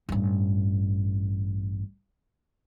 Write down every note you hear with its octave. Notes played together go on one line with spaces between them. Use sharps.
A1 G2